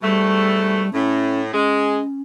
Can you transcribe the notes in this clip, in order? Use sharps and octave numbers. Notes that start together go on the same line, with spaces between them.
G#2 B2 G3 A3
A2 C#4
G#3 C#4